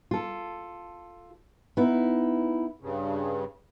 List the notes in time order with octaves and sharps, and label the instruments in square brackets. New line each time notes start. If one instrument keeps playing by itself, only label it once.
[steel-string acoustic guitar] F4 A4
B3 D#4 E4
[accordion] G2 C#3